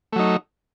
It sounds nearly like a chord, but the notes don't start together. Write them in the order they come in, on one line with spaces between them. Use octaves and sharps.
A3 F#3 D#4